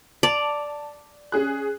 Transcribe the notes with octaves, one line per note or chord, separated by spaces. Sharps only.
D5 A5 F7
C#4 G#4 F#6